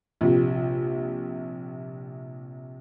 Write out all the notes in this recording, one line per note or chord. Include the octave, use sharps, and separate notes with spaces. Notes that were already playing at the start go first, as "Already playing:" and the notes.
A#1 C3